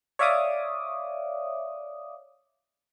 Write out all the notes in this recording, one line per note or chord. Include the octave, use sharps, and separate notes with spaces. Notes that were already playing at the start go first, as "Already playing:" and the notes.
C#5 D5 E5 F5 D6 D#6